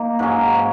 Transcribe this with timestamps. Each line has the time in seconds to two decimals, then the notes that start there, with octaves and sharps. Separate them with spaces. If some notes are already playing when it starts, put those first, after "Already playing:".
Already playing: A#3 D#4
0.19 G#2 F#3 C#4 G#4